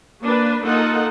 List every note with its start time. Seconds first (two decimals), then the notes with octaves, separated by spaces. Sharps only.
0.21 A#3 D4 B4
0.62 A#3 D#4 F4 A4 D#5 F#5